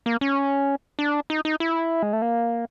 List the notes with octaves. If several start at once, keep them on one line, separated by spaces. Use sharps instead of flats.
A#3
C#4
D4
D#4
D#4
E4
G#3
A3
A#3